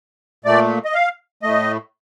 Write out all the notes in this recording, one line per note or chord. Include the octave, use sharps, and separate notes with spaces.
A#2 A3 D5
D#5
F5
A2 A3 D#5